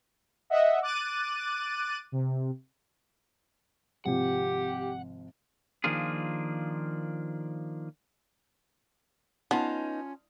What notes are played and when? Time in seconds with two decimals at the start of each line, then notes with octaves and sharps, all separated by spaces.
0.50 D#5 E5 F#5
0.82 D6 F#6 A6 D#7
2.12 C3
4.06 G#1 C3 F3 G4 F#5
5.84 D#3 F3 A#3 D4 F4 G#4
9.51 B3 C#4 D#4 F4 A5